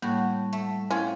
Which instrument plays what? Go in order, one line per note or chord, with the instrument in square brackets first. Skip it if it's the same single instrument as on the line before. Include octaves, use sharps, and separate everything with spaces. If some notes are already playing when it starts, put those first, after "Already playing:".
[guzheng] A2 F#4 [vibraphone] G3 A5 [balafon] A#3
[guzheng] A3
[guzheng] C4 F4 [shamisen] C#4 [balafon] E4